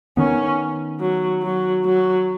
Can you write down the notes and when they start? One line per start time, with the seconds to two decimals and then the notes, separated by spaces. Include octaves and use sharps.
0.17 D#3 B3 C#4
1.00 F#3
1.43 F#3
1.84 F#3